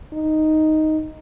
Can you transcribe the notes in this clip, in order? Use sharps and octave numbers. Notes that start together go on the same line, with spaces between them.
D#4